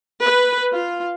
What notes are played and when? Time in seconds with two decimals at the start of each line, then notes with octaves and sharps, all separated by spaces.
0.24 B4
0.72 F4